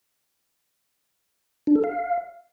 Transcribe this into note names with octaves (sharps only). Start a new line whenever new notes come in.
D4
A4
F5